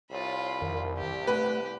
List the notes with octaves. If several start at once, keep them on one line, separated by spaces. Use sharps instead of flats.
C2 F4 C#5 B5
F2 D#3 A#4
G4
A3 B4 F#5 F#6